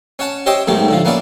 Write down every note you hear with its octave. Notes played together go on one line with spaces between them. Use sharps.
C#4 C#5 F#5 A5
G4 C5 C#5 D#5 E5 G5
B1 G#2 D#3 A3 G4
A2 D3 F3
A#3 B3 C#4 E4 D5